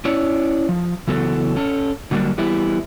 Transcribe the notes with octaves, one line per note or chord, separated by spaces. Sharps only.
C#4 E4 C#5 D5
F3
C#3 E3 F#3 B3 A4
C#4 A4
D3 F#3 G3 A#3 D4
E3 G3 B3 E4